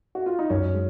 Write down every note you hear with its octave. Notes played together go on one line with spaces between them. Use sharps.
F#4
F4
D#4
F#2 C#4
G#3